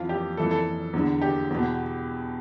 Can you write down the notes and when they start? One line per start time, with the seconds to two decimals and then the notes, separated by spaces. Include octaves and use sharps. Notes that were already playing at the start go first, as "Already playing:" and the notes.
Already playing: F2 E3 F4
0.09 G4
0.37 F2 E3 A4
0.51 A4
0.93 E2 D3
1.22 G4
1.50 E2 B2